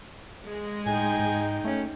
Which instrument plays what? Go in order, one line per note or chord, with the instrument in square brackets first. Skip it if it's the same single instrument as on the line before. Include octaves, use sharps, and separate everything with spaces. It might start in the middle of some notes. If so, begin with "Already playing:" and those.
[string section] G#3
[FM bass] A2 [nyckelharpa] D#4 G5 [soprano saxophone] G#5
[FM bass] G#2
[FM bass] A3 [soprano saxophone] C#4